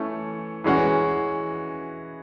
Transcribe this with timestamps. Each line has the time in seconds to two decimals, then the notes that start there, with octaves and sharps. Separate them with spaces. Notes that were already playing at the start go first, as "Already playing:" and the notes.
Already playing: E3 A3 C#4
0.64 E3 G#3 C#4 F#4